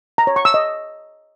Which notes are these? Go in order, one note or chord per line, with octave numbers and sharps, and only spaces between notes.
A#5
C#5
C#6
E6
D#5